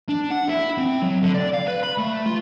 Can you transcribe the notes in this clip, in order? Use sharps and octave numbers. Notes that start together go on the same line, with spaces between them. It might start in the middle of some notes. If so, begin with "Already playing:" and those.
D4
F#5
E4
C4
F#3
D3
D5
F5
B4
B5
A3
F4